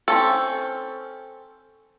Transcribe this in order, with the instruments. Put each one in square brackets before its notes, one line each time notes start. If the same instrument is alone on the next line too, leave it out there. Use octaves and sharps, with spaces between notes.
[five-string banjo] C4 C#4 A4